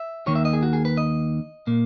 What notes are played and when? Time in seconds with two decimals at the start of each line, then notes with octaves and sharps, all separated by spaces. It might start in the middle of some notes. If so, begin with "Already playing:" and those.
Already playing: E5
0.27 D#2 D#3 A#3 C#5
0.35 E5
0.45 D#5
0.53 G#4
0.63 F#4
0.73 G#4
0.85 B4
0.97 D#5
1.67 A#2 A#3